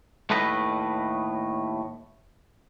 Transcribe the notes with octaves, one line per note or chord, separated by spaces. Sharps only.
D#2 A2 A3 B4 D#5